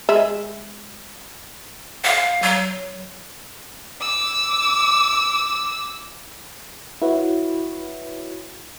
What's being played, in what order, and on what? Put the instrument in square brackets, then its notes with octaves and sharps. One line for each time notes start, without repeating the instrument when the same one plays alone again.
[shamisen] G#3 E5
[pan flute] F5
F#3
[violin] D6 E6
[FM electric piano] E4 F#4 B4 C#5